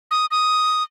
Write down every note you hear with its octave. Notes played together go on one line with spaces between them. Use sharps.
D#6
D#6